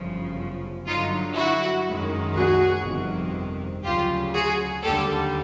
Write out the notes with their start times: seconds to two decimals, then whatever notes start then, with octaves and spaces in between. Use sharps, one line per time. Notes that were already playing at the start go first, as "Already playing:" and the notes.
Already playing: G1 F#2 C#3 F3
0.87 G2 D3 F#3 D#4 F4
1.36 E4 F#4
1.86 F#2 D#3 G#3
2.35 F#4 G#4
2.85 G1 F2 C3 D#3
3.84 D2 C#3 F#3 F4 G4
4.34 F#4 G#4
4.83 D#2 D3 G3 G4 A4